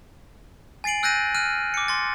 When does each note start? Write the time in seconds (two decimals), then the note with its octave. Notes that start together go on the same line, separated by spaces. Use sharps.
0.84 G#5 A6 C7 D7 F#7
1.03 E6 F#6 G6 A6 A#6 D#7
1.35 F6 F#6 D#7
1.74 D6 C#7
1.88 C6 A6